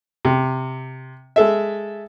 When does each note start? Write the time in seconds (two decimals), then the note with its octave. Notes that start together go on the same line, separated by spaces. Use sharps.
0.25 C3
1.36 G#3 A4 E5